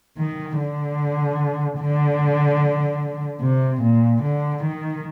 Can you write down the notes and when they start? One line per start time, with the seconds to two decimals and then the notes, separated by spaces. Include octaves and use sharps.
0.18 D#3
0.58 D3
1.80 D3
3.41 C3
3.81 A#2
4.22 D3
4.63 D#3